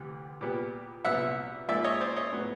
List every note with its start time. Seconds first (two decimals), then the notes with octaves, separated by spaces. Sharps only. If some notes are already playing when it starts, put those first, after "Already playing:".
Already playing: D2 C3 E3 G3
0.41 A#2 G3 B3
1.05 C2 A#2 F#3 B3 E5 F#5
1.69 G#2 F3 A#3 D5 E5
1.84 C#5 D#5
2.01 C5 D5
2.16 C#5 D#5
2.33 A2 F#3 B3